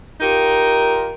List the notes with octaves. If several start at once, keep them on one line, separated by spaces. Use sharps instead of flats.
D#4 F4 G4 A#4